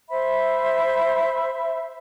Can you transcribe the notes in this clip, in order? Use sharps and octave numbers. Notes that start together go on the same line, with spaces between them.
C5 E5 B5